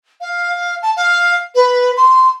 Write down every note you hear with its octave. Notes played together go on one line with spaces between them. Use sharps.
F5
A5
F5
B4
C6